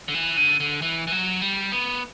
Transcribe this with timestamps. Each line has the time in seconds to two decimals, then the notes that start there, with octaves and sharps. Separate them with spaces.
0.08 D3
0.15 E3
0.37 D3
0.60 D3
0.82 E3
1.07 E3
1.12 F#3
1.42 G3
1.72 B3